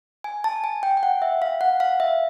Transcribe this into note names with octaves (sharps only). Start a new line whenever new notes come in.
G#5
A5
G#5
G5
G5
F#5
E5
F5
F#5
F5
E5